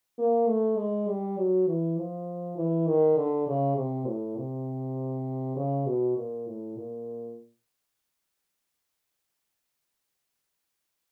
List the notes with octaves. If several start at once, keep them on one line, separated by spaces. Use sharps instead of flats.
A#3
A3
G#3
G3
F#3
E3
F3
E3
D#3
D3
C#3
C3
A2
C3
C#3
B2
A#2
A2
A#2